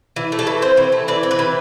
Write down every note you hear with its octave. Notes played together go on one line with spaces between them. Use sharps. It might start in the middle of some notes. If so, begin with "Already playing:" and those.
E3
A3
A4
E3
C4 C5
E3
A3
E3 D5
C4
B4
E3